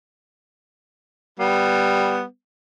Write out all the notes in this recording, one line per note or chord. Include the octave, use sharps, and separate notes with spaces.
G3 B3